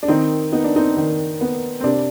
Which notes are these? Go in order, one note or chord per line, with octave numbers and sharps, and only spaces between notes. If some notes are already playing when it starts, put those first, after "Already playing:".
D4
D#3 C4 D#4
B3 D#4
D4
C4 D#4
D#3
B3
C4
C3 D4